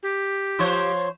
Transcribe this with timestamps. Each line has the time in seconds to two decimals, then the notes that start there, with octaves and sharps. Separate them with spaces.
0.03 G4
0.59 F3 C5 C#5